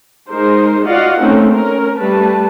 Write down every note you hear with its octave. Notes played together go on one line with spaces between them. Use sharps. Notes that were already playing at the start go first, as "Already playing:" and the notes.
G#3 D#4 A#4 C5
F4 F#4 D5 D#5 F5 F#5
A3 A#3 C4 C#4 D#4
C#4 A#4
G3 A3 B4 A5